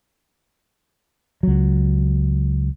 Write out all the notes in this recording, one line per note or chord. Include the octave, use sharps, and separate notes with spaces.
C#2 F#3